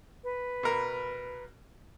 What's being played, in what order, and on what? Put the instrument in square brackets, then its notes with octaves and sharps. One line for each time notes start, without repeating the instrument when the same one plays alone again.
[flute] B4
[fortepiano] B2 A#4